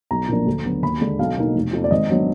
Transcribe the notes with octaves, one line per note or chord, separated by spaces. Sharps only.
B1 A#5
A#2 F3 A#3 D4
D2
D3 F#3 B3
D#2 B5
D3 G#3 D4
B1 F5
B2 A#3 D#4
F1
F2 F3
D5
G#1 D#5
F#3 B3 D4